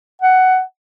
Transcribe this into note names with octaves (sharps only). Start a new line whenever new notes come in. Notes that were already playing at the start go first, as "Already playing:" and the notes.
F#5